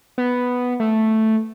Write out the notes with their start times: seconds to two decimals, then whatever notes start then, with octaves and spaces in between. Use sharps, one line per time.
0.18 B3
0.80 A3